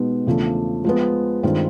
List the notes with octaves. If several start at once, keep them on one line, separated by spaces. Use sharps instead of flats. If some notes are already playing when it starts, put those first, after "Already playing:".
Already playing: B2 G#3 B3 D#4 G4
E2 C#3 F3 A3 D4
F3 G#3 B3
G2 D#3 G#3 C4 F4